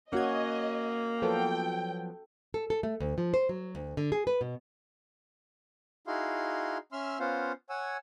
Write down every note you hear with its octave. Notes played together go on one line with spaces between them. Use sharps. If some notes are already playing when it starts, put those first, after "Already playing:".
A#3 C#4 F#4 D#5 F#5 G#6
F3 F#3 B3 A4 G5
A4
A4
A3
D2
F3
C5
F#3
D2
D3
G#4
B4
B2
D#4 E4 F#4 G#4 F5 C6
C#4 E5 C6 E6 F6
B3 C#4 F4 C5 F5 F#5
C#5 F#5 G#5 E6